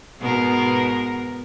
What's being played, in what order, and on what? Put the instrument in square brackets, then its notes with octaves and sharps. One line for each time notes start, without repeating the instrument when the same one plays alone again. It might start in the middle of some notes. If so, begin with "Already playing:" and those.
[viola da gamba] G#2 B2 A#4